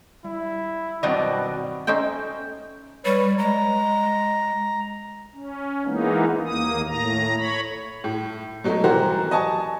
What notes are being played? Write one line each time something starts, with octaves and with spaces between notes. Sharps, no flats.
G3 E4
G2 B2 D#3 F#3 G3 C4 D5 D#5
A3 C#4 D#4 C5 G5
G3 B4 C#5
G#3 A#5
C#4
E3 G#3 A#3 B3 D#4
D#2 A#3 D#6
A2 A#5
C#5 B5
A2
B2 F#3 G#3 A3
E3 F#3 G3 F#4 A#4 C5
D#5 G#5 A5 C#6